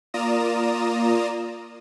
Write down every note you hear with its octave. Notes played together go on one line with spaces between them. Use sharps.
A#3 F4 D5 A#5 D#6 E7